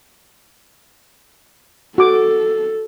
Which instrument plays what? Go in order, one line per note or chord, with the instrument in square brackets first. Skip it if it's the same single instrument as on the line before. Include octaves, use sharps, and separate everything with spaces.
[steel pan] F#4 D6 [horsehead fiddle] A4